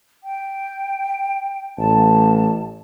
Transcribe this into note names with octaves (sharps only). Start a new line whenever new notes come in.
G5
A1 A5